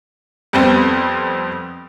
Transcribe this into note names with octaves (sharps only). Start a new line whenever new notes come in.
F2 G3 B3 C4